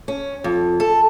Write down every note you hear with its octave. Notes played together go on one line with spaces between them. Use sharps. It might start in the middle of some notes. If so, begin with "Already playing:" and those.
C#4
F2
A4